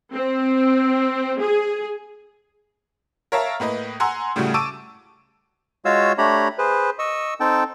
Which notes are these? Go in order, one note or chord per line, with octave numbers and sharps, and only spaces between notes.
C4
G#4
A#4 C#5 E5 F5 A5 A#5
A2 A#3 B4 D#5
F#5 G#5 A#5 C6 E6
A2 C#3 G3 A3 F#4
A5 C#6 D6 E6 D7 D#7
G#3 F4 F#4 C#5 F5 E6
A3 D4 G4 C#5 A#5 B5
G#4 B4 C5
D#5 C#6 E6
C4 D#4 A4 G5 A5